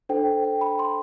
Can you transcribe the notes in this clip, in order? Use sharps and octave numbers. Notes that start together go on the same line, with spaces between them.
D4 A4 C5 G5
G5
B5
C6